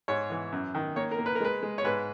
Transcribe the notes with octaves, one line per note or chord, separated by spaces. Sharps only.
G#2 C#5
E3
F#2
D#3
A#3 C#5
A#4
A#3
B4
A#4
G#3 B4
G#3
C#5
G#2 B4